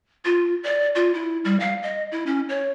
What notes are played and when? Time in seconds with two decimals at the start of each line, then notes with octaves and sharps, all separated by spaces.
0.25 F4
0.63 D5
0.95 F4
1.14 E4
1.45 G3
1.60 F5
1.83 D#5
2.12 E4
2.26 C#4
2.49 C#5